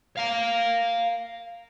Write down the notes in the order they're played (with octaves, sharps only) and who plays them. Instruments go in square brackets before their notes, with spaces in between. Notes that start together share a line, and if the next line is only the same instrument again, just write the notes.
[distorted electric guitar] F5 A#5